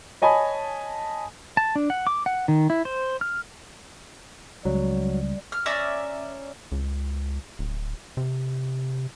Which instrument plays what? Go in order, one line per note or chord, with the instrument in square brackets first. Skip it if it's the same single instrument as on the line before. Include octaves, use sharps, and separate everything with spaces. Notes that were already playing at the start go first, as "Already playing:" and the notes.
[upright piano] C#5 D#5 G#5 A5 B5
[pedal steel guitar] A5
D4
F#5
D6
F#5
D#3
E4
C5
F6
[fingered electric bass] C#2 [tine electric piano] F#3 [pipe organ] G3
[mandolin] F6
C#4 D5 E5 A#5
[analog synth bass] C#2
D1
C3